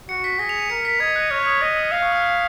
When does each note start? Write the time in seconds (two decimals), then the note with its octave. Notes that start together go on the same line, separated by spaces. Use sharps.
0.09 F#4 C#7
0.24 B6
0.39 G#4 A#6
0.49 F7
0.60 D#7
0.70 A#4 C#7
0.85 B6
1.00 D#5 G#6
1.16 F#6
1.31 C#5 F6
1.46 D#6
1.62 D#5
1.77 D#6
1.92 F5 F6
2.02 C#6
2.12 D#6
2.22 F6